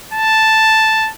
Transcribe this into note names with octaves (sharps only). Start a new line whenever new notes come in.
A5